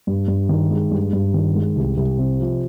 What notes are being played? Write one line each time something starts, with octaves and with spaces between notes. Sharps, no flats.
G2
G2
D#3
G#3
G2
G2
D#3
G#3
C2
C2
C3
F3